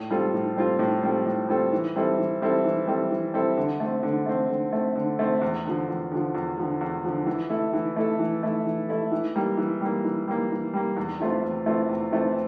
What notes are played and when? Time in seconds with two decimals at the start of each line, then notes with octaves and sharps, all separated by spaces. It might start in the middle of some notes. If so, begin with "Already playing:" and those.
Already playing: A2
0.10 G3 C4 F4 A4
0.34 A2
0.56 G3 C4 F4 A4
0.79 A2
1.03 G3 C4 F4 A4
1.26 A2
1.49 G3 C4 F4 A4
1.72 E3
1.96 G3 C4 E4 A4
2.18 E3
2.42 G3 C4 E4 A4
2.64 E3
2.87 G3 C4 E4 A4
3.11 E3
3.34 G3 C4 E4 A4
3.57 D3
3.80 A3 C4
4.03 D3
4.26 A3 C4
4.49 D3
4.73 A3 C4
4.96 D3
5.19 A3 C4
5.42 E2
5.65 D3 F3
5.88 E2
6.11 D3 F3
6.35 E2
6.58 D3 F3
6.81 E2
7.04 D3 F3
7.27 E3
7.50 A3 E4 A4
7.73 E3
7.96 A3 E4 A4
8.19 E3
8.43 A3 E4 A4
8.66 E3
8.89 A3 E4 A4
9.12 E3
9.36 G3 A#3
9.58 E3
9.81 G3 A#3
10.04 E3
10.28 G3 A#3
10.51 E3
10.74 G3 A#3
10.97 E2
11.20 E3 A3 C4 F4
11.43 E2
11.66 E3 A3 C4 F4
11.89 E2
12.12 E3 A3 C4 F4